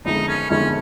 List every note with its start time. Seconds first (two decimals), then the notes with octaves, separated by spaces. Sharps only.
0.05 G1 F2 D#3 G#3 D#4
0.28 C#4
0.50 G1 F2 D#3 G#3 C#4